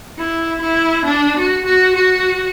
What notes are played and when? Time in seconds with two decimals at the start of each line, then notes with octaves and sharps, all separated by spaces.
0.18 E4
0.62 E4
1.06 D4
1.36 F#4
1.65 F#4
1.95 F#4